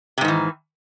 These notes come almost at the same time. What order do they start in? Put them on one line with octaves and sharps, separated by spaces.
C3 G#2 D#3 E3